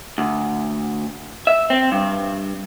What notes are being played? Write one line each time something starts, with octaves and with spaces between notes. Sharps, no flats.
D2
E5
C4
G2